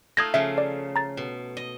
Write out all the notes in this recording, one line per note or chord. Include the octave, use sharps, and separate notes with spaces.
A3 D#4 F4 D#6 G#6 A#6
C#3 F3 A3 E5
D5
A#5 A6
B2
D#5